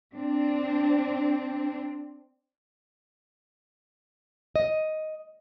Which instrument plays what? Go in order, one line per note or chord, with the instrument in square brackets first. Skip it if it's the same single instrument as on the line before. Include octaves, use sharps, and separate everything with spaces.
[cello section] C4 D4
[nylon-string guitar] D#5